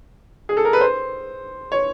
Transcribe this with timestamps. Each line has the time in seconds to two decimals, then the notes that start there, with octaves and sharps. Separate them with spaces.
0.49 G#4
0.57 A4
0.65 A#4
0.73 B4
0.81 C5
1.72 C#5